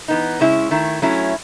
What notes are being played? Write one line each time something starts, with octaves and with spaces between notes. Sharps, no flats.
E3 B3 D#4
C#3 G#3 C#4 E4
D#3 A3 E4
F#3 A3 C#4 E4